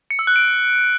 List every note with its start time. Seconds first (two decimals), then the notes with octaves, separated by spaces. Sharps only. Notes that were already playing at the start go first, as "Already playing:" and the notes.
0.10 C#7
0.19 E6
0.27 F#6
0.36 D7